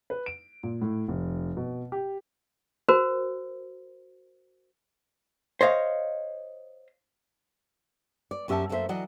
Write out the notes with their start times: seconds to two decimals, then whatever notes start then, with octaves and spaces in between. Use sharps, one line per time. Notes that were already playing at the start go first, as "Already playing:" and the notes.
0.10 B4
0.26 D7
0.63 A#2
0.82 A2
1.08 F1
1.57 B2
1.92 G4
2.89 F#4 A#4 C5
5.61 C5 C#5 D#5 F5
8.31 D5
8.48 F#2 C#4 G4 E5 F#5 A5
8.69 F#2 A3 A#3 G4 C5 E5
8.89 E3 F#3 D5 D#5 F#5